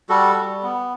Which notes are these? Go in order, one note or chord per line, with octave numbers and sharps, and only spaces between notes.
G3 F#4 A4
G3
B3